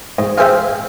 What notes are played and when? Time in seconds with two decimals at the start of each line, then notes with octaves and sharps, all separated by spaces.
0.18 G#2
0.38 F4 G#4 C5 E5 G5